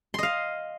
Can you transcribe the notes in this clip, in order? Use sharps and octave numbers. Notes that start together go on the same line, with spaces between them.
D#5 F5 C6